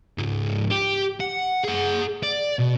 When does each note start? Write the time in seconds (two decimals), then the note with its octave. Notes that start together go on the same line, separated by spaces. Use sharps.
0.18 C#2 G#2
0.71 G4
1.20 F#5
1.64 G#4 F#5
2.23 D5
2.59 B2